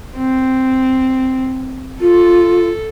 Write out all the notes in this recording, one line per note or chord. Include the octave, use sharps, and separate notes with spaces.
C4
F4 A4